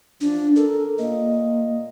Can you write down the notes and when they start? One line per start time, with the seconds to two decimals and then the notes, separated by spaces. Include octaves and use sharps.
0.21 E2 F3 D4
0.56 A4 A#4
0.98 A#2 A#3 D#5